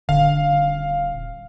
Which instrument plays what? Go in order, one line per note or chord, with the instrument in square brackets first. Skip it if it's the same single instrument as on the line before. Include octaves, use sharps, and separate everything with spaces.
[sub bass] D#1 [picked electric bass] D3 [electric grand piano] F5